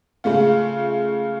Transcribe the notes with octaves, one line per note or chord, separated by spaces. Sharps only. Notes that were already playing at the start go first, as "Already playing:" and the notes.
C#3 G#3 A3 F4